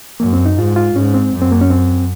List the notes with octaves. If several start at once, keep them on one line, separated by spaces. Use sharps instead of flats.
F#2 A#3
C4
D#4
G#2 F4
F4
G#2 C#4
C4
F#2
C4
A#3
C#4
C4